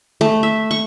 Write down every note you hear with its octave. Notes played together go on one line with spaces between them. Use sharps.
A3
E5
C#6